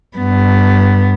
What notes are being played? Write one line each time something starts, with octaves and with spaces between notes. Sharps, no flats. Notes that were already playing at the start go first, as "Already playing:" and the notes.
G2 B3